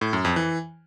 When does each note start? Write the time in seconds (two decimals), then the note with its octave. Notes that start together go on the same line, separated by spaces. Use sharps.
0.01 A2
0.13 F#2
0.25 F2
0.36 E3